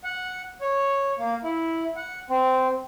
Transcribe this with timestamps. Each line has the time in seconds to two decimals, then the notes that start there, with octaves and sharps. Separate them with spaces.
0.04 F#5
0.61 C#5
1.19 A#3
1.43 E4
1.96 F#5
2.30 C4